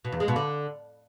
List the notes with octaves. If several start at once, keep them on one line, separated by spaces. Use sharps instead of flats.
B2
E2
G#3
B2
D3